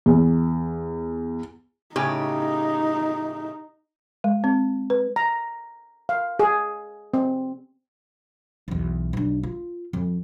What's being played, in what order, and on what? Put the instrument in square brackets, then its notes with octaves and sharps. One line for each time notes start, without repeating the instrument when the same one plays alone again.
[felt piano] E2
[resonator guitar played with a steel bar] A2 C#3 G4 [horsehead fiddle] D#4
[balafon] G#3
C4
B4
[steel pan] A#5
F5
G#4
C4
[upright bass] B1 E2
B1 D4
F4
F2